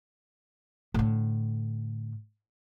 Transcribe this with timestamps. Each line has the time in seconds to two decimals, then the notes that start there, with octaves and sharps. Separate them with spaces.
0.94 A2 D3